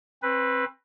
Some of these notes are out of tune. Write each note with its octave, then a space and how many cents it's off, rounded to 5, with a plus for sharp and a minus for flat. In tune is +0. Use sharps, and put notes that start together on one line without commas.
C4 +30 B4 +0